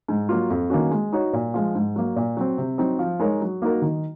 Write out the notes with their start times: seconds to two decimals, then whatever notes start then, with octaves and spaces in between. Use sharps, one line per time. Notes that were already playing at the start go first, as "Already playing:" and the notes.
0.08 G#2
0.29 F#3 A#3 F4
0.50 F2
0.70 D#3 A#3 C#4 F#4
0.91 G#3
1.13 D#4 F#4 C#5
1.33 A#2
1.54 F3 G#3
1.75 G#2
1.96 F#3 A#3
2.16 A#2
2.37 F#3 C4
2.58 C3
2.78 F#3 C4 D#4
2.99 F3
3.19 G#3 D#4 A#4 C#5
3.41 F#3
3.62 A#3 D#4 F#4 A#4
3.82 D#3